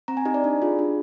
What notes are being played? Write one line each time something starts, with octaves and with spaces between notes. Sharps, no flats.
C4 A#5
G#5
D#4 G4 D#5
D5
D4
F4 G#4
D4